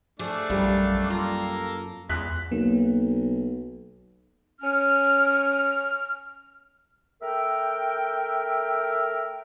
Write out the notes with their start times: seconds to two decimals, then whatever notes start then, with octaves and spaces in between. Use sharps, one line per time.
0.19 F3 A3 D4 G#4 D5
0.50 A#1 F#2 G3 F5
1.10 A#3 F4 A4 A#5
2.09 E2 G#3 F#6 B6
2.52 B1 A#3
4.61 C#4 F6
7.22 A3 A#4 E5 G5